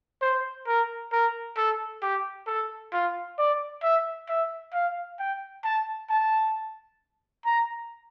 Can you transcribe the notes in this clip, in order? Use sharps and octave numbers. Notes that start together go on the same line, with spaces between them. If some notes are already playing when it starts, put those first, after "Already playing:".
C5
A#4
A#4
A4
G4
A4
F4
D5
E5
E5
F5
G5
A5
A5
A#5